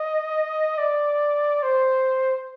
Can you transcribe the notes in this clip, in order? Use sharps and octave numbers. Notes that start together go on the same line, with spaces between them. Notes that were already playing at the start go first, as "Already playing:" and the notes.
Already playing: D#5
D5
C5